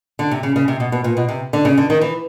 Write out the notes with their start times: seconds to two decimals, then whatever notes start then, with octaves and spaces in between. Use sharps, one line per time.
0.19 D3
0.31 C3
0.43 C#3
0.56 C#3
0.68 C3
0.80 B2
0.92 B2
1.04 A#2
1.17 B2
1.29 C3
1.53 D3
1.65 C#3
1.78 D3
1.90 D#3
2.01 E3